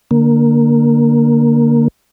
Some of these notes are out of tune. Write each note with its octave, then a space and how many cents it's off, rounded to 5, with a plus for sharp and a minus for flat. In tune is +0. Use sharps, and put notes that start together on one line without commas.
D3 +0 A#3 +0